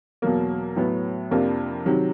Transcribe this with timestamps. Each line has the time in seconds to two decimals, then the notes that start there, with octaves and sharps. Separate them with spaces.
0.22 E2 B2 F#3 A#3
0.76 A2 F#3 B3
1.31 F2 C3 F3 A#3 D4
1.86 C3 D#3 F#3